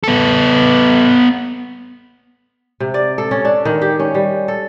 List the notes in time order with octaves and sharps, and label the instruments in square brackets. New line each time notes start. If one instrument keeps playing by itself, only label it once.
[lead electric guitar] B3 A4
[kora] C3
D5
A4
C#4
D4
D#3
G4
C#4
G3
A4